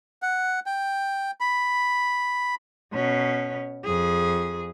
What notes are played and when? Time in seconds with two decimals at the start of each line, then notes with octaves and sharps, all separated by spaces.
0.22 F#5
0.66 G5
1.40 B5
2.93 B2 C#4
3.85 F2 G#4